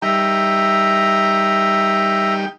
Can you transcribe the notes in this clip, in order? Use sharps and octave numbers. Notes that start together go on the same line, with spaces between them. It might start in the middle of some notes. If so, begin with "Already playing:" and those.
G3 D#4 E5 G5 A#5